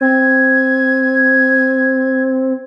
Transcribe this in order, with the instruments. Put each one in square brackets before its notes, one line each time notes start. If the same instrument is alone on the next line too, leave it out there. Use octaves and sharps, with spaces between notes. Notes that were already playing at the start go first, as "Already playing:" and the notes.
[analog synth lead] C4 [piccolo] G#6